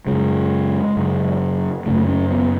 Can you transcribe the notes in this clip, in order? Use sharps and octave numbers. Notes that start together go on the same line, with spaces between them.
F#2 C#3 G#3
F#2 C#3
F#2 C#3 A3
C#4
B3